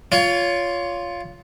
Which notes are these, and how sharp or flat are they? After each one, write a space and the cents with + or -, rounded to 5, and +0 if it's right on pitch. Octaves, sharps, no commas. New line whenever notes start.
F4 +0 C#5 +25